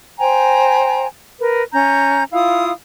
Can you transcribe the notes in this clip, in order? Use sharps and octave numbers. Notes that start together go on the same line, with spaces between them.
C5 G5 G#5 A#5
A#4 B4
C#4 A#5 G6
E4 F4 F5 D#6